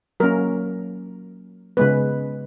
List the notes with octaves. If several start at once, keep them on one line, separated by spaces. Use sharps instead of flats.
F#3 A#3 C#4 A#4
C#3 G#3 B3 B4